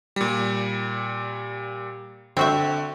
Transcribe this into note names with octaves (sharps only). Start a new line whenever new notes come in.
A#2 G3
D3 C4 F#4 E5